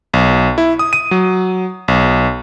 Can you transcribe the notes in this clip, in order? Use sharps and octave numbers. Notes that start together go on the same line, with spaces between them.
B1
E4
D#6
D#7
F#3
B1